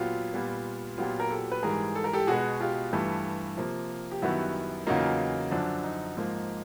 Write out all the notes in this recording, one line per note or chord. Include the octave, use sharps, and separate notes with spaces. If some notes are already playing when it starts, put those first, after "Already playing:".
Already playing: A#2 F#3 B3 F4 G4
A#2 G3 B3
A#2 F#3 B3 F4 G4
A#4
G4 A4
B4
G#2 E3 G3 G#4 A#4
A4
A#4
G4 A4
B2 G#3 B3 F#4 G#4
F4 G4
G2 E3 A3
C3 F3 A#3
G4
F#2 D#3 G3 B3 E4 F#4
E2 C#3 F#3 A#3 D#4 F4
F#2 D3 F3 D4
D#4
G#2 F3 A#3